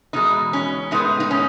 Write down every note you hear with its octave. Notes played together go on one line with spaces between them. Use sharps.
E2 B2 G#3 D#4
C#4
A2 G#3 B3 D#4
D#4
C#4